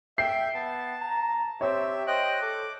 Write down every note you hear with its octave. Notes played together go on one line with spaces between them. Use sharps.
E5 G5 G6 C7
B3 A5
A#5
C4 G4 C#5 E5
C5 D#5 G5 F#6
A4 D6